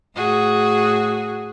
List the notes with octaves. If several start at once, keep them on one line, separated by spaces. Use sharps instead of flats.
A2 F#4 G#4